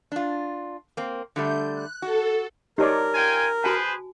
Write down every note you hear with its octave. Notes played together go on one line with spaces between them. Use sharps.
D4 F4
A#3 C4
D3 G3 A3 G6
F#6
F#4 A4
D#4 G4 A#4 C#5 D5 A5
F4 G5 G#5
F#4 G#4 B4 C5 G#5 A5